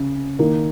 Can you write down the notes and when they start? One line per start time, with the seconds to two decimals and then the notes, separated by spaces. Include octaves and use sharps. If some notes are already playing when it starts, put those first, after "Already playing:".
Already playing: C#3
0.39 D#3 A#3